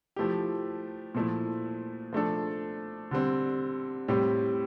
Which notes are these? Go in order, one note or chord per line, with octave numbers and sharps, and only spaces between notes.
F3 A3 E4 G4
A#2 F3 A3 E4
F3 A3 D4 A4
D3 G3 C4
A2 G3 C4 G4